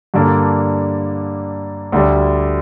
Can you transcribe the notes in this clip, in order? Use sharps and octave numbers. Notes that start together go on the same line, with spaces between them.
G2 D3 A#3 D4
D2 D3 G3